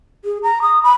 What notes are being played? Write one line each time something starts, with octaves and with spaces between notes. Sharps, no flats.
G#4
A#5
D#6
B5